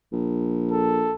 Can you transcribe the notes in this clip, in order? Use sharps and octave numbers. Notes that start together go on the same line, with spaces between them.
A#1
A4